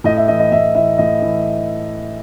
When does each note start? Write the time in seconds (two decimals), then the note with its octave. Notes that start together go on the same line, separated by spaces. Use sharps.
0.04 A2 D#5
0.16 E5
0.28 E3 D#5
0.39 D#5
0.52 A2 E5
0.75 E3 E5
0.98 A2 D#5
1.22 E3